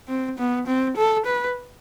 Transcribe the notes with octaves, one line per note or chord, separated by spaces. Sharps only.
C4
B3
C4
A4
B4